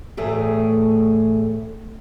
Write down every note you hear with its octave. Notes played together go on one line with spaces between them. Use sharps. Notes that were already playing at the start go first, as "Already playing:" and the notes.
E2 A2 A3 G#4